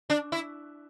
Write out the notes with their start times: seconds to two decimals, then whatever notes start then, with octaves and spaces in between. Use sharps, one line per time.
0.10 D4
0.32 E4